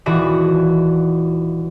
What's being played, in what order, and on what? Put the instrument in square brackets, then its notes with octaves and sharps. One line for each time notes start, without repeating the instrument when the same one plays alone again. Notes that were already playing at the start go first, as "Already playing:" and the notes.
[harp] D#1 E3 F#4 D5 B5